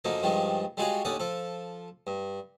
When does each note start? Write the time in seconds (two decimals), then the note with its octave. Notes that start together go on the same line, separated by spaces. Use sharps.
0.05 F#2 D3 F3 A#3 D#4
0.23 G2 D#3 F3 G3 G#3
0.77 G3 G#3 F4 F#4 G#4 C#5
1.05 D#2 D3 C#4 D5 F#5 D#6
1.20 F3 A4
2.07 G2